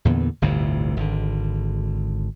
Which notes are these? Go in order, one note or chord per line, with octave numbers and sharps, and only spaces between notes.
E2 A#2 D3 B3
G1 D2 A2 C3
G#1 D3